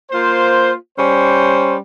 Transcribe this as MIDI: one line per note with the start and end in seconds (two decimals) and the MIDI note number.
0.11 0.73 58
0.11 0.73 65
0.11 0.73 72
0.98 1.76 55
0.98 1.76 61
0.98 1.76 72